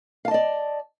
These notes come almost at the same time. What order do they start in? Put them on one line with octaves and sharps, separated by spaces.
F5 A5 D#5 D5